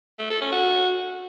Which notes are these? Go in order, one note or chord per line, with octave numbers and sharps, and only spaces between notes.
A3
A4
C#4
F#4